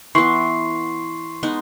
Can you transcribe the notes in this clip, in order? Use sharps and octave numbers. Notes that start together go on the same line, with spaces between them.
E3 B3 C6 C#6 C7
G#3 B3 D#4